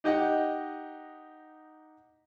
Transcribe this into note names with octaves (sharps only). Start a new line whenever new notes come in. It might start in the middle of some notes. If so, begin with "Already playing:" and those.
D#4 G4 D#5 F#5